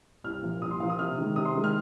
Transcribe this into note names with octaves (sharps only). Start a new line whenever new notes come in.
C2 F6
A#2 F3
C2 D#6
C6
A#2 F3 F5
D#6
C3 F6
D#3 G#3
C3 D#6
C6
D#3 G#3
F6